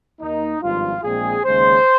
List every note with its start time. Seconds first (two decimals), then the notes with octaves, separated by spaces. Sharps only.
0.20 D#2 D#3 A#3 D#4
0.61 G#1 G2 F3 F4
1.03 A#1 A#2 G#3 C4 G#4
1.44 D#2 C#3 G#3 C#4 C5